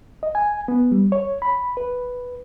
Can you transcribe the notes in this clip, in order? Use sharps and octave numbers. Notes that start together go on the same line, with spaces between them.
D#5
G#5
B3
G3
C#5
B5
B4